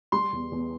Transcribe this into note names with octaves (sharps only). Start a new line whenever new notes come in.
G3 C6
E2
E2